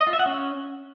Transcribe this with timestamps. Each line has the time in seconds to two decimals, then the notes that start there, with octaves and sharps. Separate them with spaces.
0.01 D#5
0.07 F4
0.13 E5
0.19 F#5
0.26 C#4